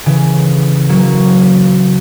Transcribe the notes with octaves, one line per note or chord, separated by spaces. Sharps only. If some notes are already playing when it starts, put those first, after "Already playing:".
C#3 E3
F#3 A#3